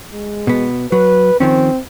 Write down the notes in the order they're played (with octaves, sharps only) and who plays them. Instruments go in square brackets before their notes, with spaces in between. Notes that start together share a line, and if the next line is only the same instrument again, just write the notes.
[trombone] G#3
[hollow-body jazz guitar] B2 B3
[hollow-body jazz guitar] F#3 [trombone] B4
[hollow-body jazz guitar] D#3 F3 C#4 [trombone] C4